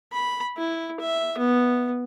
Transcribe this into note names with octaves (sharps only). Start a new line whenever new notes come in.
B5
E4
E5
B3